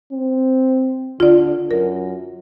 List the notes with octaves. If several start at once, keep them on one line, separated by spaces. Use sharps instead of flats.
C4
D3 F4 D5
F#2 A#4